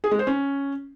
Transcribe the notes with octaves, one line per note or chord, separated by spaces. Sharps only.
G#4
G#3
C5
C#4